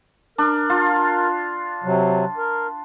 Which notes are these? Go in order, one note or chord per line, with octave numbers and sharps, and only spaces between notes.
D4 A#4
F4
C3 F#3
A#4